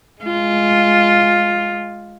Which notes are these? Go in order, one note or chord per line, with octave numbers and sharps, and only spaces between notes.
G#3 F4